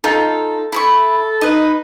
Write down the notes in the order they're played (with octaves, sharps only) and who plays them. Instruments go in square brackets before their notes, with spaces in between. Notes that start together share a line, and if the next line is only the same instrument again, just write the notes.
[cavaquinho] D#4 F4 [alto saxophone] A4
[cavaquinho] E4 B5 C#6 [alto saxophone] A4
[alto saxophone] D#4 [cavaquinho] B4 D#5